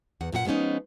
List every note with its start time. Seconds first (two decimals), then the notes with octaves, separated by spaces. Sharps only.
0.21 E2 F#5
0.32 F#2 A#2 F#4 F#5
0.45 F3 G#3 B3 C#4 D#4